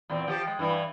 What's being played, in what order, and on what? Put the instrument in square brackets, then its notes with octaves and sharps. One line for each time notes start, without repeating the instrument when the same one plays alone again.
[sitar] E2 A#2 C4
F3 G4
G#3
G2 E3 E4